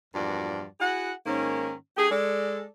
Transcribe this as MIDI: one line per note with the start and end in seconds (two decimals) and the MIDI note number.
0.14 0.64 40
0.14 0.64 43
0.14 0.64 46
0.14 0.64 53
0.14 0.64 66
0.14 0.64 74
0.80 1.12 64
0.80 1.12 66
0.80 1.12 68
0.80 1.12 78
1.26 1.73 44
1.26 1.73 51
1.26 1.73 58
1.26 1.73 61
1.97 2.09 57
1.97 2.09 62
1.97 2.09 67
1.97 2.09 68
2.10 2.66 56
2.10 2.66 69
2.10 2.66 74